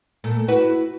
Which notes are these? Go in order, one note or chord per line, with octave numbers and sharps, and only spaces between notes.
A#2 A3
E4 F#4 B4